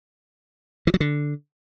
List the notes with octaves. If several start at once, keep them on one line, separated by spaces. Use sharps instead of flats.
E3
F#3
D3